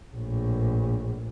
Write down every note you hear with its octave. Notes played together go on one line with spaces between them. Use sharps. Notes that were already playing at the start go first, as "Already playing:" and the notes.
A#1 A2